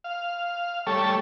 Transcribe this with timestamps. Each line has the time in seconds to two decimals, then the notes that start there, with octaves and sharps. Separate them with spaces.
0.04 F5
0.87 G3 A3 A4 C#5